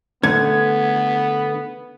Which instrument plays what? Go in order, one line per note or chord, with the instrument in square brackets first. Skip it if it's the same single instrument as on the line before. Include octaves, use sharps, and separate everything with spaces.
[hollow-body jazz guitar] D3 A3 [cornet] B3 [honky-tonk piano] G#6